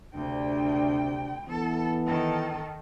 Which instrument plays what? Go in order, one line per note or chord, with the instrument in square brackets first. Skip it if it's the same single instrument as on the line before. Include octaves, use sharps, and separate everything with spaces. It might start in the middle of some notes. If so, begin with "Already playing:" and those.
[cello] D2 G5 [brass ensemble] C3 D4
[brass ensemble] E3 B3 [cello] A4
[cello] D#3 A4